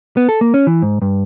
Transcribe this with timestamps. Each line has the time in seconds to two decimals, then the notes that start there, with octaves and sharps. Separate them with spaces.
0.17 B3
0.29 A4
0.41 A#3
0.54 C#4
0.67 E3
0.82 G#2
1.02 G2